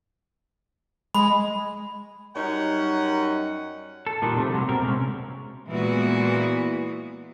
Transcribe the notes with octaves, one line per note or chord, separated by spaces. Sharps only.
G#3 B5
F#2 G3 C#4 D#4 F#5
A4
A#2 D#3 G3 D4
C3 F3 A3
C3 F#3 G3
B2 C4 A#4
C3 G#3 C4 C#4
A#2 E3 G#3 B3 F#4 G#4